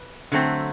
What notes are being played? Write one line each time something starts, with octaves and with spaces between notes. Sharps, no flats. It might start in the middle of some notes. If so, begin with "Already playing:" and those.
Already playing: B4
D3 F#3 A3 C4